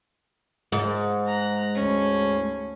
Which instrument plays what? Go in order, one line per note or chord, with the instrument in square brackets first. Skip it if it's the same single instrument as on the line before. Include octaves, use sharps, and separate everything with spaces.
[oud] G#2
[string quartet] A#5 F#6
D2 C#4